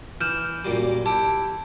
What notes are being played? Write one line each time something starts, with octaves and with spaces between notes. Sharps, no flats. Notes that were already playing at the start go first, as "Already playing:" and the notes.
E3 F6 G6 E7
F#2 A#2 G3
E4 G4 A5